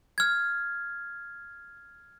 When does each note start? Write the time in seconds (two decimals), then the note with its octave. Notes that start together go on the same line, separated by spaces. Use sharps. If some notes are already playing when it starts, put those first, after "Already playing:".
0.18 F6 G#6